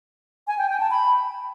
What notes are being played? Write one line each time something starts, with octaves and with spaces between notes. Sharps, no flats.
G#5
G5
G5
A5
B5